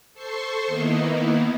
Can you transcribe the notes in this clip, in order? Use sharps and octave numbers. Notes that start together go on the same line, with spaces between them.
A4 C5 C6 C#6
D#3 A#3 B3 D#4 E4